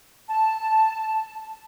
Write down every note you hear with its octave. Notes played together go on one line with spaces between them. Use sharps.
A5